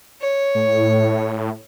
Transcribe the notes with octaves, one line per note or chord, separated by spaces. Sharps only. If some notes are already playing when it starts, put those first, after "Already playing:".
C#5
A2